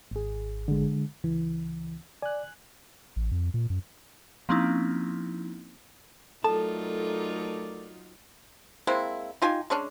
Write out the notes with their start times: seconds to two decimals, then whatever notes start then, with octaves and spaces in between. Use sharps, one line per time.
0.11 G#1 G#4
0.68 D3 G#3
1.24 C#2 E3
2.22 D5 G#5 F#6
3.16 A1
3.31 F2
3.54 A#2
3.70 F#2
4.49 F3 A#3 C4 C#4 D#4 E4
6.44 F#3 A3 D#4 F4 A4 A#4 D5 A5
8.87 G#3 A#3 C4 E4
9.42 D#4 F4 G4 G#5
9.70 G#3 C#4 D4